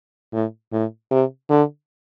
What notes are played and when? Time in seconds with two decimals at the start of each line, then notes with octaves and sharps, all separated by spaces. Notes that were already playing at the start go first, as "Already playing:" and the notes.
0.33 A2
0.72 A2
1.11 C3
1.50 D3